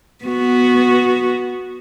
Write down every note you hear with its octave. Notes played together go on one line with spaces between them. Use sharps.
B3 F#4